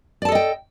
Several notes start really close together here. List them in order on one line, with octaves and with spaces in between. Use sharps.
D5 A5 A4 D#5 G5